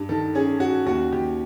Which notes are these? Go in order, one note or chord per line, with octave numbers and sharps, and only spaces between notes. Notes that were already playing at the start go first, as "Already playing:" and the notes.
Already playing: G2
D#3 A4
C#4 G#4
C#4 F#4
D#2 F#4
D#2 G4